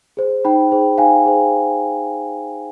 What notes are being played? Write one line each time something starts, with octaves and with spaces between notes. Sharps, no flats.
G#4 C5
D#4 G5 B5
G#4 C5
D#4 F5 G#5
G#4 C5